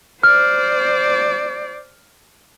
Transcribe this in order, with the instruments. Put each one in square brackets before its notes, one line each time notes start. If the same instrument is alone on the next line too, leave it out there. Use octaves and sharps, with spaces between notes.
[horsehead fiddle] C5 D5 [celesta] F6